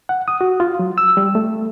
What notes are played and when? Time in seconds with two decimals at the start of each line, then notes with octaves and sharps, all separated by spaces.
0.09 F#5
0.28 D#6
0.41 F#4
0.60 F4
0.79 F#3
0.98 E6
1.17 G3
1.35 A3